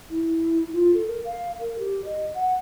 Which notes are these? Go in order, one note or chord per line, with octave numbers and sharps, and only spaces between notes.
E4
F4
A4
A#4
F5
A#4
G4
D#5
F#5